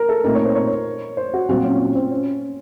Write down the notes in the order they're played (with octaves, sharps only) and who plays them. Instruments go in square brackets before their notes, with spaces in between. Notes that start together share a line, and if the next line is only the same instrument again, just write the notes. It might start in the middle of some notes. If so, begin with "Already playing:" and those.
Already playing: [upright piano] A#4
A4
[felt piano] A#2 A3 C4 D#4 A4 [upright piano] A#4
[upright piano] C#5
C5
C#5
C5
F#4
[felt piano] A#2 F#3 C4 F#4 [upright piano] F4
[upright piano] C#4
C#4
C4
C#4